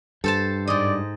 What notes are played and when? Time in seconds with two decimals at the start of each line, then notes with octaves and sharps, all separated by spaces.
0.24 G2 A4 C5 A5
0.67 G#2 D5 D#5